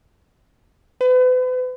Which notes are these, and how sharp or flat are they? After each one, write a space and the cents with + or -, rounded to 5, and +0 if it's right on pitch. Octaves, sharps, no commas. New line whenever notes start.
B4 +40